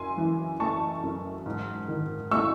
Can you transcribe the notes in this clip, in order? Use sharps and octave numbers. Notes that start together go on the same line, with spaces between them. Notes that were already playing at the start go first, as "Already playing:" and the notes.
Already playing: F#2 G#5 C6
E3
A3 A5 C#6
F#2
G#2
D#3
A3 C#6 E6